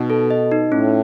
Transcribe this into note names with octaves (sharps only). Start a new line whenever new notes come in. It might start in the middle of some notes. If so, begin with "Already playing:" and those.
Already playing: B2 D#4
A4
D#5
D#4
A2 C#4